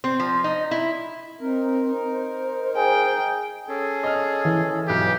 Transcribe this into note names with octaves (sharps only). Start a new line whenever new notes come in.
C4
F3
D#4
E4
C4 D#4 A#4
C5
G#4 G5
C#4 G#4 A4
D#5 F6
E3
B1 G4 G#5